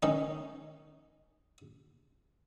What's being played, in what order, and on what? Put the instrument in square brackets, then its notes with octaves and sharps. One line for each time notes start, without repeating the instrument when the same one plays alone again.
[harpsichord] D#3 C#4 D#4